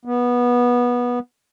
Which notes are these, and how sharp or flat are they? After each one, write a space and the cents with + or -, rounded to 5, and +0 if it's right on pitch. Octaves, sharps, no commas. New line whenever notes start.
B3 -20